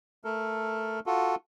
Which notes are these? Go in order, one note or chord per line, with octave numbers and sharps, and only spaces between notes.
A3 A4 A#4
F4 F#4 A4